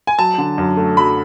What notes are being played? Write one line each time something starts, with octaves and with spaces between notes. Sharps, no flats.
G#5
F#3 A5
D3
F#2
A3
F#3 B5